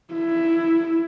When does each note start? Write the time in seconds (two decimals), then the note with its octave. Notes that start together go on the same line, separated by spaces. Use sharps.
0.14 E4